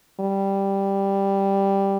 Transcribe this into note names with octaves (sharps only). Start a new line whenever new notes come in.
G3